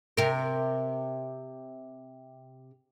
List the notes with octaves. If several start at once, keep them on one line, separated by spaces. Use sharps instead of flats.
C3 A#4